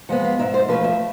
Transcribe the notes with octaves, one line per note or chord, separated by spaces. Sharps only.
F3 G#3 B3 F#5
F5
G#2 E5
C5
F3 A3 B4
E5